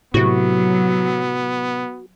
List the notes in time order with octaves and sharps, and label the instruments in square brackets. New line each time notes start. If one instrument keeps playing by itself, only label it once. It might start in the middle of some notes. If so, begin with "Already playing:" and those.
[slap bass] A2 C3 [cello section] F#3 [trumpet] B3 [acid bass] F#4